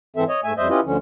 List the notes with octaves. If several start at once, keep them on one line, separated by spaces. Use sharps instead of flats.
G#2 E3 C4 A4 E5
C#5 D#5
G#2 A3 E5 G#5
F2 G3 C5 D#5 E5
C#4 E4 F4 G4 B4 D#5
D2 D3 F3 C#4